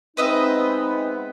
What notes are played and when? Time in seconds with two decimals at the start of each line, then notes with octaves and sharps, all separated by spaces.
0.17 G#3 B3 C4 D#4 B4 D#5 E5